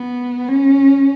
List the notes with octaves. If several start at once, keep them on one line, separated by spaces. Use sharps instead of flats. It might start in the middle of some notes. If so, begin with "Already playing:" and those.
Already playing: B3
C#4